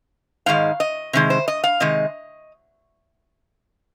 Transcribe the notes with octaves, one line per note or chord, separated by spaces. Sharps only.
G#2 D#3 G#3 F5
D#5
C3 D#3 G#3
C5
D#5
F5
C3 D#3 G#3 D#5